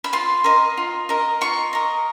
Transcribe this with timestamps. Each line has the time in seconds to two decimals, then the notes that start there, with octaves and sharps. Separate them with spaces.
0.04 B5
0.13 F4 C6
0.44 A#4 D#5
0.77 F4
1.09 A#4 D#5
1.41 F4 C#6
1.73 A#4 D#5